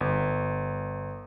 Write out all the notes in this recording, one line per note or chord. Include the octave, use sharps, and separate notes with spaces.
G1